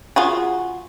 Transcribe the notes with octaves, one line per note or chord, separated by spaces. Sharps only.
F4 F#4 G#4